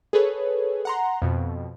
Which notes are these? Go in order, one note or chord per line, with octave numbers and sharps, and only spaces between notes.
G#4 A4 B4 C#5
F#5 A#5 C6
F2 B2